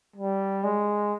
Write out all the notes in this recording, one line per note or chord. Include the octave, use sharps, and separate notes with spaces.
G3
G#3